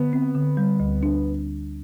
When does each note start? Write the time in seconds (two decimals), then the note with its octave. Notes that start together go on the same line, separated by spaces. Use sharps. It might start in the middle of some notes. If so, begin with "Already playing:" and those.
Already playing: D3 B3
0.13 C4
0.35 D3
0.57 G3
0.80 D2
1.03 D4